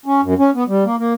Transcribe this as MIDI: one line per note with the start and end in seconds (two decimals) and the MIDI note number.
0.06 0.21 61
0.23 0.34 42
0.39 0.50 61
0.55 0.64 59
0.68 0.84 55
0.85 0.96 58
0.98 1.13 58